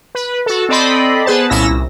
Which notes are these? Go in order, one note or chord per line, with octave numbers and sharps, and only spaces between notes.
B4
F#4 A4
C4 A4 D5 D#5 B5 C6
B3 G#4 B4 C5 A5
C2 A#2 C#4 E4 E6 A#6
C2